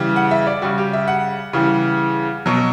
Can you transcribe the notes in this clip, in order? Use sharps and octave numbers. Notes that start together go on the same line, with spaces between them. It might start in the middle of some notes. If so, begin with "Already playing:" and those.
Already playing: C#3 E3 G3
F#5
E5
D5
C#3 G3 F#4
G4
E5
F#5
C#3 E3 G3
B2 F#3